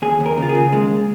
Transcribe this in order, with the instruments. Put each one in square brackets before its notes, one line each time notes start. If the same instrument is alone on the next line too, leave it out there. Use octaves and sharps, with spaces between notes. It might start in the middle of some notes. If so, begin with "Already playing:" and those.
[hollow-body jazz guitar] D#2 G#4
D#2
A#4
C#3 F4
G#4
C#3
D#2 G#3